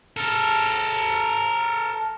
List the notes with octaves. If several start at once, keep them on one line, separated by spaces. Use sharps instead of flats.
A4 A#4